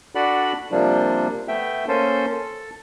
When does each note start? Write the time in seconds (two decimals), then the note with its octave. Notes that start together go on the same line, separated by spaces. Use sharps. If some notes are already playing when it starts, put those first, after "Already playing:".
0.15 D4 F#4 A4 D5 F#5 B5
0.71 C3 F3 G3 A#3 D4
1.48 A3 B3 E5 G5
1.88 A#3 C#4 A4 C5
2.32 A4